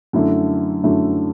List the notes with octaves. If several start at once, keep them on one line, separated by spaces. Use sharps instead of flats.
F#2 D3 A3 E4
F#2 D3 A3 E4